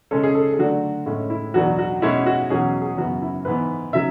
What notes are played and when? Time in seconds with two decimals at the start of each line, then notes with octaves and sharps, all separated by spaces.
0.11 C#3 G#3 C#4 A4
0.23 G#4
0.35 A4
0.53 G#4
0.58 D3 F#3 A3 D4 F#4
1.06 A2 G#3 C#4 E4
1.30 E4
1.54 E2 B2 F#3 B3 D4 F#4
1.79 F#4
2.02 B2 G#3 C#4 E4
2.26 F#4
2.50 E2 B2 F#3 C#4 G#4
2.82 G#4
2.97 F#2 C#3 E3 B3 F#4
3.22 E4
3.45 G#2 E3 B3 B4
3.93 C#3 F#3 E5